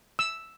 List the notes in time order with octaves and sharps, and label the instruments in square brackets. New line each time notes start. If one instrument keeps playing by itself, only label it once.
[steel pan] E6